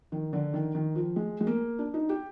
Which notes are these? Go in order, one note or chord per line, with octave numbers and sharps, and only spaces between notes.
D#3
D3
D#3
D#3
F3
G#3
G#3
A#3
D4
D#4
G4